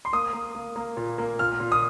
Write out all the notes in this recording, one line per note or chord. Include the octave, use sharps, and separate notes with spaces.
C6
A#3 D#6
A#3
A#3
A#3
A#2
A#3
A#2 F6
A#2
D#6